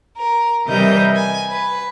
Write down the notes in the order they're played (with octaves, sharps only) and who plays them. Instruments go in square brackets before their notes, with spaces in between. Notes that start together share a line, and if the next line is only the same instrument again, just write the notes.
[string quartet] A#4
C3 E3 G3 A#4 D#5 G6
G#5
B4